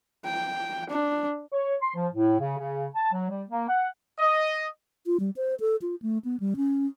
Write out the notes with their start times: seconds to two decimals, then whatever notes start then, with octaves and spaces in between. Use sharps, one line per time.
0.24 G5
0.90 D4
1.53 C#5
1.81 C6
1.95 F3
2.13 A2
2.39 C#3
2.58 C#3
2.95 A5
3.13 F#3
3.30 G3
3.49 A#3
3.69 F#5
4.19 D#5
5.06 F4
5.20 G3
5.36 C5
5.60 A4
5.82 F4
6.02 A3
6.25 B3
6.40 G3
6.56 C#4